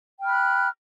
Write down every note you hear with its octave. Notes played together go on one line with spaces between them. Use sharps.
G5 B5 F6 F#6